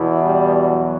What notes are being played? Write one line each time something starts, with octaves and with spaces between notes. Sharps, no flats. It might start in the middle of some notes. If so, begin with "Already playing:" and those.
Already playing: E2 B2 E4
G3
F#3